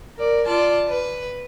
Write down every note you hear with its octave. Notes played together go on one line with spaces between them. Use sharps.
A#4 D5
F4 D5 A5
B4